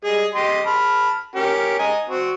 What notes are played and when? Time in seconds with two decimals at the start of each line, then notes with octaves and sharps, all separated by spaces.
0.04 G3 G#4 D#5
0.34 G4 D#5 C6
0.66 A5 B5 F6
1.35 C#4 G4 A#4
1.79 D#5 G#5 A#5
2.09 C4 F#4